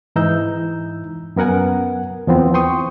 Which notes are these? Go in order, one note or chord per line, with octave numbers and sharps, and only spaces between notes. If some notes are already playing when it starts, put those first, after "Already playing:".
G#2 E3 D#4 A#5 E6 G6
F#2 B3 A#4 F#5 G#5
E2 F3 B3 C4
G5 C6 C#6 D#6